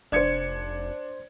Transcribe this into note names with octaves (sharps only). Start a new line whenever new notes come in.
F1 D4 C5 D5 G#6 C#7